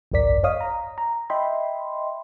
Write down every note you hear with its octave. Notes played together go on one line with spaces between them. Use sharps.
G#1 C#2 F#2 A#4 D5 B6
C#5 D#5 F5 D#6
A#5
A#5
D#5 E5 G5 B5 C6